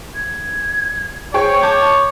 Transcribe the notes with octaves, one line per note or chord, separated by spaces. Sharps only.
G#6
G#4 C5 C#5 G5 C#6
A5 C#6 D6 G6